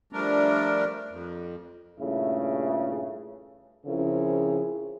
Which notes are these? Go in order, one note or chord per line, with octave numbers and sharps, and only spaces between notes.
F3 G3 A3 D4 A#4
F2
G2 A#2 C#3 A3 E4
C#3 F3 C4 E4 G#4 A#4